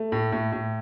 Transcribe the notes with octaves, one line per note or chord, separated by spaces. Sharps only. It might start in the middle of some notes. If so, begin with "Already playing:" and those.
Already playing: A3
A2
A2
A2